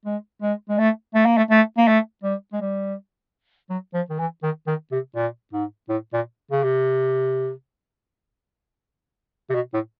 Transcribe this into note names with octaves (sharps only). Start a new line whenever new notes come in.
G#3
G#3
G#3
A3
A3
A#3
A3
A3
A#3
A3
G3
G#3
G3
F#3
F3
D#3
E3
D#3
D#3
C3
A#2
G#2
A2
A#2
C#3
C3
C3
B2
A2